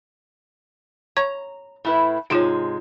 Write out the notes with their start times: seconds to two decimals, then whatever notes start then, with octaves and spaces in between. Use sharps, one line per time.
1.17 C#5 A#5 C#6 G#6
1.85 A2 E4 B4
2.30 G#2 C3 G#3 D#4 F4 C#5